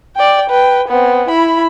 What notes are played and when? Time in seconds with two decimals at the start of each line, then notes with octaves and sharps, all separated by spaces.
0.16 D5 G5
0.50 B4 G5
0.88 B3 C4
1.28 E4 B5